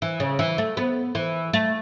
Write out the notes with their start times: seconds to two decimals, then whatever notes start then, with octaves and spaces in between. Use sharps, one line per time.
0.02 E3
0.20 C#3
0.39 E3
0.58 A3
0.77 B3
1.15 E3
1.53 A3